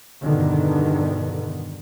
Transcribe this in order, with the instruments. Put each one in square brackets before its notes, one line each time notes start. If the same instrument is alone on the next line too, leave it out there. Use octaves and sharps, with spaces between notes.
[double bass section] E2 G2 B2 D3 D#3